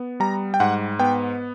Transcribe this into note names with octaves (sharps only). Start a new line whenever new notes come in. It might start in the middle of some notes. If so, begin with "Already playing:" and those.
Already playing: B3
G3 A#5
G5
G#2 F#5
B3 G5